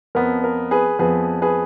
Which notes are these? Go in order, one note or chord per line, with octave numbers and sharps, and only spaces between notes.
F2 F3 B3 A#4
A#4
G#4 B4
F2 F3 B3 G#4 B4
G#4 B4